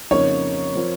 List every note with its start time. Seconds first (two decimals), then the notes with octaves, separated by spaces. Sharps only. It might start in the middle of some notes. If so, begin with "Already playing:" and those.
0.11 F2 C#3 F3 A#3 D#4 C#5
0.75 F3 C4 F4 A#4